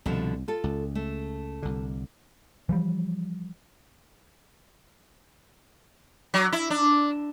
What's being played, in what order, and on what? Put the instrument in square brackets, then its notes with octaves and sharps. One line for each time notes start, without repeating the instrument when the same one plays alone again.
[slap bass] C2 [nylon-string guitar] B2 D3 F3
[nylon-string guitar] F4 A4
[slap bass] C#2
[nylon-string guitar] A3
[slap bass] C2 D3
[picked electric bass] E3 F3 G3
[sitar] F#3
E4
D4